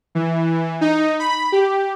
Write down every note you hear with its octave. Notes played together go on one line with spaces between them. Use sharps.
E3
D#4
B5
G4